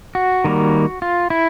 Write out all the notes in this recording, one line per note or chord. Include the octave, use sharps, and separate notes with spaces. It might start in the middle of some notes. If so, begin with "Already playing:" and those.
F#4
D#3 G3 A#3
F4
E4